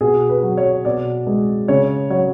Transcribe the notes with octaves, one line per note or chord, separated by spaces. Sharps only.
B2 G#4
B4
F#3
C#5
B2 D5
G#3
C#3 C#5
F#3 C#5